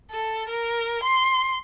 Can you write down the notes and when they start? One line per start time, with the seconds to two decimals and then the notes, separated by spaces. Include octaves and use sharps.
0.11 A4
0.48 A#4
1.03 C6